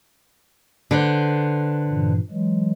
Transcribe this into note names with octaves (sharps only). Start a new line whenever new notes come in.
D3 B4 C5
G2 A#2 E3
E3 F#3 G#3